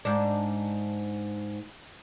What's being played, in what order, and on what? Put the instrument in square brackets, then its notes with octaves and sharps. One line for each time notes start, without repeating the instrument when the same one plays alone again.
[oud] G#2 D4